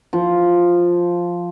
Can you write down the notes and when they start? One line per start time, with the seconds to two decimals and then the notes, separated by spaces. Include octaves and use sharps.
0.13 F3